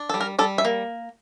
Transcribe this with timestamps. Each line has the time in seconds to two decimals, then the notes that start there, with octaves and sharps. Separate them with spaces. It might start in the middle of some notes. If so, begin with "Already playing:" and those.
Already playing: D4
0.09 G3 A4
0.21 A#4
0.39 G3 A4
0.58 E5
0.65 A#3